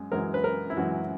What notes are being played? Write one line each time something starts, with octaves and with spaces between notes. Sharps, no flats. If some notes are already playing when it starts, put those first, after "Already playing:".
Already playing: F#2 G#3
F#2 E3 G#3 A#4
B4
A#4
E4
F#2 E3 G#3 F#4